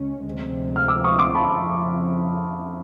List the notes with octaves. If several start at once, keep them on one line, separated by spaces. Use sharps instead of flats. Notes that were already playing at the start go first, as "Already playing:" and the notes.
Already playing: C#2 C#4
D2 C3 F3 G#3 C4
F6
D6 E6
C#6 D#6
C6 D6
A5 B5
F2 C#3 F3